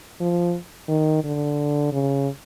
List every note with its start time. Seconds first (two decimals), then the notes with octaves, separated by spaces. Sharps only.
0.20 F3
0.88 D#3
1.24 D3
1.92 C#3